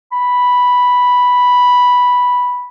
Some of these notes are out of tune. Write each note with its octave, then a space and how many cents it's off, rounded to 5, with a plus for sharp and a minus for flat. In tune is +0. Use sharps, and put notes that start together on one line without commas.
B5 -5